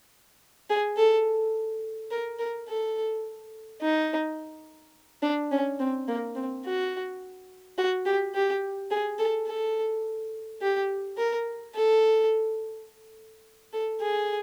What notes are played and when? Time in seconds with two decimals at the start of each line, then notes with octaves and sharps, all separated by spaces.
0.70 G#4
0.97 A4
2.11 A#4
2.39 A#4
2.67 A4
3.81 D#4
5.22 D4
5.51 C#4
5.79 C4
6.08 A#3
6.35 C4
6.65 F#4
7.78 F#4
8.05 G4
8.34 G4
8.91 G#4
9.18 A4
9.47 A4
10.61 G4
11.17 A#4
11.75 A4
13.73 A4
14.00 G#4